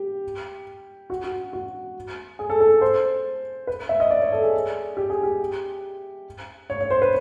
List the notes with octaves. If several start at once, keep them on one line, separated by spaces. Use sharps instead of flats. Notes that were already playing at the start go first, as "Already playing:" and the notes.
Already playing: G4
F#4
F#4
F#4
G#4
A4
A4
C5
B4
E5
D#5
D5
C#5
A4
G#4
G4
G#4
G4
C#5
C#5
C5
B4